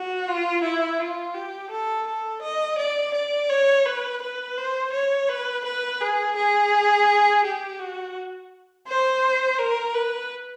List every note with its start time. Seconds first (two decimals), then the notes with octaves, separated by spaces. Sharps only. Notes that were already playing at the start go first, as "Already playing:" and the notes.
Already playing: F#4
0.28 F4
0.63 E4
0.99 F4
1.35 G4
1.70 A4
2.07 A4
2.42 D#5
2.79 D5
3.14 D5
3.49 C#5
3.86 B4
4.22 B4
4.58 C5
4.93 C#5
5.29 B4
5.65 B4
6.01 G#4
6.36 G#4
7.44 G4
7.79 F#4
8.87 C5
9.59 A#4
9.94 B4